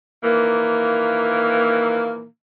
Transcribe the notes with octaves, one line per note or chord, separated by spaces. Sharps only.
A#2 D#3 E3 A#3